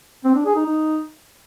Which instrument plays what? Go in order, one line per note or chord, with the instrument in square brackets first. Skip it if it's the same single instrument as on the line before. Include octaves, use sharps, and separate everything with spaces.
[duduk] C4
D4
G#4
D#4
D#4